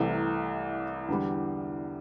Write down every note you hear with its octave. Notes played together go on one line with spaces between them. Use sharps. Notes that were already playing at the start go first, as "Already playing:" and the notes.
Already playing: C2 C3 E3 A3
E2 D3 G3